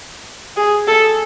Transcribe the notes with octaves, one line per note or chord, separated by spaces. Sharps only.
G#4
A4